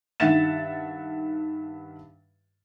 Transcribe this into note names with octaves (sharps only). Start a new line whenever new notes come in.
G2 D#3 E5 F#5 A6 E7